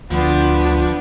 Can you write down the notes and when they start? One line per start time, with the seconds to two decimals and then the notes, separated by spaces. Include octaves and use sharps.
0.11 D2 F3 B3 D4